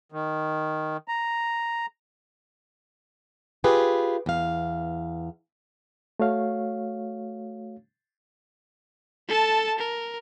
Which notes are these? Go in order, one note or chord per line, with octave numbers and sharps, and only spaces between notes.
D#3
A#5
F4 G4 G#4 B4
E2 F5
A3 F#4 C#5 F5
A4 A5
A#4